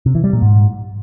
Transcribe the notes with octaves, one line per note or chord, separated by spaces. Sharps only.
C3
E3
G3
A#2
G#2